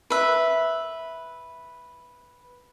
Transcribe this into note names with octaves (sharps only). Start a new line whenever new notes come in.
B4 E5